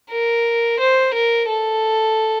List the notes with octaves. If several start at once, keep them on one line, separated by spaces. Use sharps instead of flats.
A#4
C5
A#4
A4